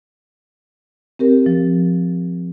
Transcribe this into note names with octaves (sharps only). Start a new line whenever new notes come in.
C4 G4 A#4
F3